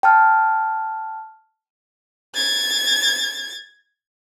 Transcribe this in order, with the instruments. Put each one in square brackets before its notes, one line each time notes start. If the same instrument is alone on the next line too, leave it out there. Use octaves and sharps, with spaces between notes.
[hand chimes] G5 A5 F6
[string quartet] G#6 A6